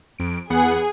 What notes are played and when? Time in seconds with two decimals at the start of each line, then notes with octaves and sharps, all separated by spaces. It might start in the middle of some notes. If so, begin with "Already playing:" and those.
0.19 F2 D7
0.50 E2 B3 G#4 F#5